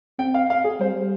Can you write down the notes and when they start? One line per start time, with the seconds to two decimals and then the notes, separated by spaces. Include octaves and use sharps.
0.19 C4 G5
0.34 F5
0.50 F5
0.64 G#4
0.80 G3 C5